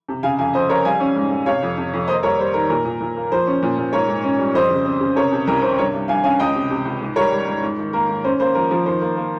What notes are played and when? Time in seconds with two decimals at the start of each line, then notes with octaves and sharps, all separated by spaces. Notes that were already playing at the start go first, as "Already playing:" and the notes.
0.09 C3
0.23 C#3 F5 G#5
0.39 F2 F5 G#5
0.54 F2 C5 D#5
0.69 F2 A#4 C#5
0.85 G3 F5 G#5
1.00 C#4
1.16 G#2
1.31 G#2
1.46 C3 C#5 F5
1.63 F2
1.77 C3
1.93 F2
2.08 A#3 C5 D#5
2.23 G3 A#4 C#5
2.39 G3 C5
2.54 D#3 A#4
2.69 A#2 A#4
2.85 A#2
3.01 A#2
3.16 A#3
3.31 F3 C5
3.47 C#4
3.63 A#2
3.78 A#2
3.92 G#2 A#4 C#5
4.08 G#2
4.24 C#4
4.39 G3
4.54 F2 C5 D#5
4.70 C#3
4.85 C4
5.00 C#3
5.16 C3 A#4 C#5
5.32 C3
5.47 C2 A#4
5.62 C3 C5
5.77 G2 A#4 C#5
5.94 G2
6.08 G2 F5 G#5
6.24 C#4 F5 G#5
6.39 C#2 D#5 G5
6.55 C3
6.70 C3
6.85 C#2
7.01 G#2
7.16 G3 A#4 C#5
7.32 G3
7.48 G#2
7.63 G#2
7.78 D#3
7.93 A#3 A#4
8.09 G#2
8.24 C#4 C5
8.40 A#3 C5
8.55 F3 A#4
8.71 F3 A#4
8.86 D#3 C5
9.01 A#3
9.17 A#3